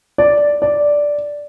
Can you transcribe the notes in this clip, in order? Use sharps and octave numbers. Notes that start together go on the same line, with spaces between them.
D5
D5